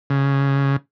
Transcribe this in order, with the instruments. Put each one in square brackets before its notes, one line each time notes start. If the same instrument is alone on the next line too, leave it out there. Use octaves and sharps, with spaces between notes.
[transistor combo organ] C#3